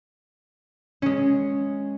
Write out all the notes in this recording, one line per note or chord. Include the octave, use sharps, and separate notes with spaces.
G#3 C#4